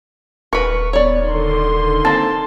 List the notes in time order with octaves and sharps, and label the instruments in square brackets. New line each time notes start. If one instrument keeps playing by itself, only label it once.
[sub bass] D#1 [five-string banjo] A#4 B4 [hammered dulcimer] C#6
[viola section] B3 [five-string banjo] C#5 D5
[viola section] D3 D#3 C6
[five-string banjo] A#3 C4 [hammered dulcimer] A5